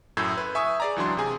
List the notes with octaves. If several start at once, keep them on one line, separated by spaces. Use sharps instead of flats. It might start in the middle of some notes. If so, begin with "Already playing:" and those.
F#2 A2 A3 E6 G6 G#6
B4
E5 G#5 C#6 D#6
G#4 D5 A#5
C#2 E3 F#3 D4 C6
C3 G#4 G#5